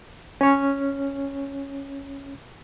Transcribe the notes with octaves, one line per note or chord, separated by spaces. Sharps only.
C#4 C#5